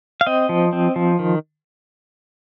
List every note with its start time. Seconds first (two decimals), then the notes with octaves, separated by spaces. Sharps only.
0.21 F5
0.27 C4 D#5
0.49 F3
0.73 C4
0.96 F3
1.19 D#3